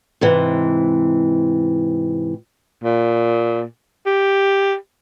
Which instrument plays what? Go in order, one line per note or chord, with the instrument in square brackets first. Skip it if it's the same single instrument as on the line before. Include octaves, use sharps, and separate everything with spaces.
[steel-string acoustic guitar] G#2 C3 E3
[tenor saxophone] A#2
G4